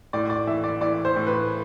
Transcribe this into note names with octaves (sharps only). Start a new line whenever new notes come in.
A2 D5
D5
E3 E5
D5
E3 D5
C5
A2
B4